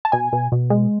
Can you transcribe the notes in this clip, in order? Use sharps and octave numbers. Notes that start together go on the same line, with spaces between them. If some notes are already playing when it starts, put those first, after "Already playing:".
A5
B2 G#5
B2
B2
G#3